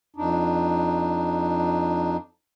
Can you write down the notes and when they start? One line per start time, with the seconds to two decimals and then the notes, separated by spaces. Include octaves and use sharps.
0.16 F2 D4 D#4